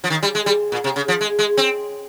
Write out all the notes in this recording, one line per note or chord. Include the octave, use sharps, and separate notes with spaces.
F3
D#3
G3
G#3
G3
A#2
C3
C#3
F3
G#3
G#3
C4